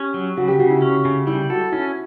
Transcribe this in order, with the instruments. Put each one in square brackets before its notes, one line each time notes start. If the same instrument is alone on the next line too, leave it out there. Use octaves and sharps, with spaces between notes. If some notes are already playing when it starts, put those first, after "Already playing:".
Already playing: [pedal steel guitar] C#4 [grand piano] G4
[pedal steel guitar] F#3
[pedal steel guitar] C#3 [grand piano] F#4
[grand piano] G4
[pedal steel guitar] C#3 [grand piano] F#4
[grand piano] E4
[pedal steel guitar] C#4
C#3
[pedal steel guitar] G3 [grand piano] E4
[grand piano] F#4 [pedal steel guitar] A4
[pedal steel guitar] C#4 [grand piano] E4